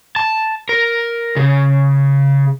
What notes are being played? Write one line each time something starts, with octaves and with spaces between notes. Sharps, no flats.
A5
A#4
C#3